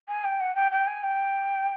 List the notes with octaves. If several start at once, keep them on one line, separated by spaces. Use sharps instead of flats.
G#5
G5
F#5
G5
G5
G#5
G5